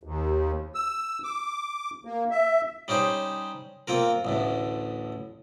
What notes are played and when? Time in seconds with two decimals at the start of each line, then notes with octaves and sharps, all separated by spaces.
0.03 D#2
0.75 E6
1.24 D6
2.05 A#3
2.30 E5
2.88 G3 C#4 D#4 G4 C5
3.88 A#3 C4 F4 A#4
4.25 A1 D2 A2